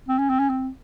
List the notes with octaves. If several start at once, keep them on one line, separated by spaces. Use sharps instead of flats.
C4
C#4
C4
C#4
C4